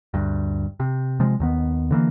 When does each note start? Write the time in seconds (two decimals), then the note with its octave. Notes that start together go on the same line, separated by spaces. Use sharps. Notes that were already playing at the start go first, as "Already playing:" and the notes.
0.14 D2 G2
0.80 C3
1.20 C3 F3 G#3
1.40 D#2 D#3 B3
1.91 D3 E3 A#3